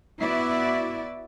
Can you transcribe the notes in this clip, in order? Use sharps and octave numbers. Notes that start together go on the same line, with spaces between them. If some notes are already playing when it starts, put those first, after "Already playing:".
B3 E4 F#4 D5 E5